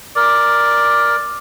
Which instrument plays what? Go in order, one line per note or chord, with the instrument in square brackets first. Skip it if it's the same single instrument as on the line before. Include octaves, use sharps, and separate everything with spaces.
[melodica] A#4 [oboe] D5